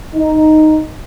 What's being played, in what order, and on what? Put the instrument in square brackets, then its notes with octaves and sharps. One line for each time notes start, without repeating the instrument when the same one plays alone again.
[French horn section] D#4